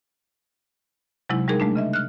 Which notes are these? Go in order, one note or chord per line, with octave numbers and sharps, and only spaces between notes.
C3 F#3 G#3 D#4 E4
G3 G#3 D#4 G#4 A#4
G#3 A3 D4
C#3 D#5 E5
F6 F#6